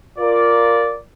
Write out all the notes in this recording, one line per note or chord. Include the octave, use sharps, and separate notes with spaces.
F4 A#4 D5